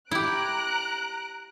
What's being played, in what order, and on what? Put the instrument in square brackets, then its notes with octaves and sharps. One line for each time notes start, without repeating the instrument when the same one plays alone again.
[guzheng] E4 G4 [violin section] A#5 F#6 D7